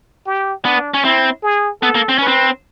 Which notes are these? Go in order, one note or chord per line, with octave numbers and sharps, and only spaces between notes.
G4
B3 D4
C#4
C4 E4
G#4
B3 A4
A#3
C4
C#4 B4
C4